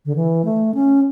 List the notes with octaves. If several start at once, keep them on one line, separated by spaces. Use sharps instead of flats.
D3
E3
A3
C#4